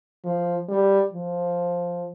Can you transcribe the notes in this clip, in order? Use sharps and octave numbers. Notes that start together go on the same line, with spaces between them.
F3
G3
F3